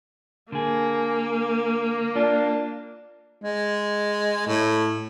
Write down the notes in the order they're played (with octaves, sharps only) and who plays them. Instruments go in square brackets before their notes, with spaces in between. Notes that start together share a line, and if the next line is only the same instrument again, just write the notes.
[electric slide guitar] D3 G#4 [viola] A#3
[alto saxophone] D4 [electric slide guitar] F4
[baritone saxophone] G#3
A2